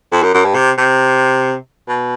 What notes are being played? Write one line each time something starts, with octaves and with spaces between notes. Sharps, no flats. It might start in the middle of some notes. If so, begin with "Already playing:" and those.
F2
F#2
F#2
G2
C3
C3
B2